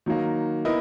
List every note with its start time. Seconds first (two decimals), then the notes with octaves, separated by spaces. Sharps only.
0.06 D#3 F#3 A#3
0.65 B3 E4 A#4 D#5